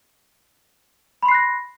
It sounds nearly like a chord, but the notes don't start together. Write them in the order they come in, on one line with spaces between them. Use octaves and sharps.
B5 C6 C7 F#6 A#6